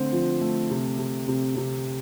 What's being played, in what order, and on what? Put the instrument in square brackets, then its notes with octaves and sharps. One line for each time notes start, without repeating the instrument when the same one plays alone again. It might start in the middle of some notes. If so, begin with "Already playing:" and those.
Already playing: [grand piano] D3 A3 C4
F3
A3
C3
C3
C3
C3